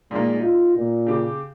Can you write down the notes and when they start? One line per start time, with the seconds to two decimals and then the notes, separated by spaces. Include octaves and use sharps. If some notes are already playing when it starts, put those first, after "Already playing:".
0.11 A#2 D#3 G#3 A#3
0.40 D#4 F4
0.75 A#2
1.06 C#3 G4